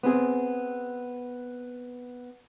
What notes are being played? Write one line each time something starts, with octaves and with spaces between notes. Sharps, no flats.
B3 C4 G#4